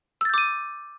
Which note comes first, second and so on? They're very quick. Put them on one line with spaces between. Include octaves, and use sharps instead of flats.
E6 A6 G6 D6 D#7